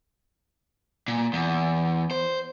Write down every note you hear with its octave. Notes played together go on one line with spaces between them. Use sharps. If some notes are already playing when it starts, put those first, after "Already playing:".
A#2
E2
C5